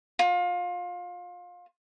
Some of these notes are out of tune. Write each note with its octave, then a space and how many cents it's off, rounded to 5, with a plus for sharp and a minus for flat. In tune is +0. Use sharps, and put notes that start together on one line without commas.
F4 +25